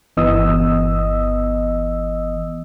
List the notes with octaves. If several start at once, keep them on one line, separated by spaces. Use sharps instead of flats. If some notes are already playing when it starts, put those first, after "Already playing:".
G1 E3 B3 D#5 D#6 E6